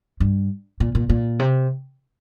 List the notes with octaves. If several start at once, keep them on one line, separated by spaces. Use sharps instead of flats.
G2
A#2
A#2
A#2
C3